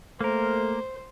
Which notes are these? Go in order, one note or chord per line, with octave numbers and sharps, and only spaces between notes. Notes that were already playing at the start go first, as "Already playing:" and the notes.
A3 A#3 A#4 C5